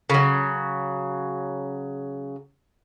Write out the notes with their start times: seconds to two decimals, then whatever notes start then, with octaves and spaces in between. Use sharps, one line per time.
0.10 C#3 F#3